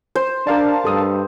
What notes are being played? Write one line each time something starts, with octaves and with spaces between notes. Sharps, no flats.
C5
D4 A#4 D5 F5 A5
G2 A4 D#6